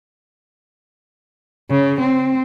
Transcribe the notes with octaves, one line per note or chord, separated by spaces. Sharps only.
C#3
C4